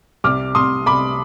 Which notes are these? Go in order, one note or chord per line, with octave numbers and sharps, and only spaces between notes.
C2 D6 F6
C2 C6 D#6
C2 B5 D6